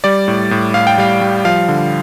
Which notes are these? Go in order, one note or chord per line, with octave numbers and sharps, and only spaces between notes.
G3 D5
A2
A2
A2 F5
G5
G3 F5
G3
F3 F5
D3